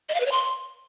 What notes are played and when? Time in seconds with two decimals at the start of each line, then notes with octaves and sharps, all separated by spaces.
0.09 D#5
0.15 F5
0.20 B4
0.26 C#5
0.32 C6